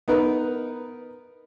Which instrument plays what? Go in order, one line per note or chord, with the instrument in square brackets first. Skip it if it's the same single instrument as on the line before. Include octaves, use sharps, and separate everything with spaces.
[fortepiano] B3 D#4 A#4 B4